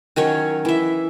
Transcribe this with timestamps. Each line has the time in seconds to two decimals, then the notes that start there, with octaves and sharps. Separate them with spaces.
0.16 D#3 F#3 C#4 C#5
0.65 E3 E5